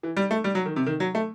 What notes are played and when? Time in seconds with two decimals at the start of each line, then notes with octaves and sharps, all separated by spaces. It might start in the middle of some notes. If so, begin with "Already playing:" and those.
0.03 E3
0.17 G3
0.31 A3
0.44 G3
0.55 F#3
0.66 D#3
0.76 C3
0.86 D#3
1.00 F#3
1.15 A3